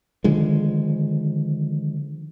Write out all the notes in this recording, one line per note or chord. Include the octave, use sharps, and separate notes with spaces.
D3 D#3 F3 G#3